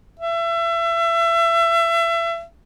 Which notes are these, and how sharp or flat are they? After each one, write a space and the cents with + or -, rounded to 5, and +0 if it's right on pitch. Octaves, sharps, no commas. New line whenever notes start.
E5 +30